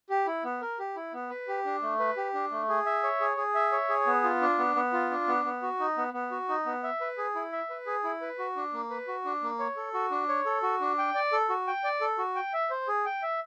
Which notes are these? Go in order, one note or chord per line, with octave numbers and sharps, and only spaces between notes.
G4
E4
B3
A#4
G4
E4
B3
B4
G4
D4
A3
B4
G4
D4
A3
G#4
E5
C#5
G#4
G#4
E5
C#5
G#4
B3
F4
D4
B3
B3
F4
D4
B3
B3
F#4
D#4
B3
B3
F#4
D#4
B3
E5
B4
G#4
E4
E5
B4
G#4
E4
B4
F#4
D4
A#3
B4
F#4
D4
A#3
C#5
A4
F#4
D4
C#5
A4
F#4
D4
G5
D5
A4
F#4
G5
D5
A4
F#4
G5
E5
C5
G#4
G5
E5